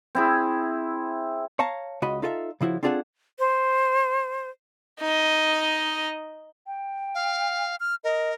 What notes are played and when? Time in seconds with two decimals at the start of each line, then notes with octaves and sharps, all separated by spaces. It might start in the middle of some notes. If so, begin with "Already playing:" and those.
0.15 C4 E4 G#4
1.59 C#5 F5 A5 A#5
2.02 C#2 F#4 D#5 B5
2.22 D#4 F4 A4 B4 E5 F5
2.61 C#3 F3 E4 F#4
2.83 C4 D4 F4 G#4 A4 F#5
3.39 C5
5.00 D#4 D#5
6.66 G5
7.15 F5
7.80 F6
8.04 A#4 D#5